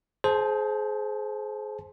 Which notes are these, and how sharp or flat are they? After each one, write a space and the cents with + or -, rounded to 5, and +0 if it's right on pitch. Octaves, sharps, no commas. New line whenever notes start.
G#4 +30 C5 +0 A5 -10